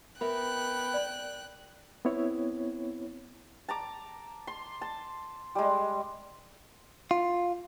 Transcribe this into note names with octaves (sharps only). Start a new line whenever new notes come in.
B3 A#4 E5 G5 F#6
D5
B3 C4 E4 C#5
A5 A#5 D6
C6
A5
G3 G#3
F4